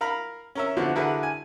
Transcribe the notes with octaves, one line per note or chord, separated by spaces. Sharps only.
A#4 F5 A#5 B5
C#4 A#4 E5
D3 F3 B3 E4 F#4
D3 E4 F#4 G#4 A#4 B4
G#5